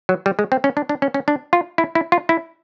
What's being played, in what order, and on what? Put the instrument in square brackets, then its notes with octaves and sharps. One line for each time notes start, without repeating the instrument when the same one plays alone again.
[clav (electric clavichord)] F#3
G3
G#3
C4
C#4
D4
D4
C#4
C#4
D4
F4
E4
E4
F4
E4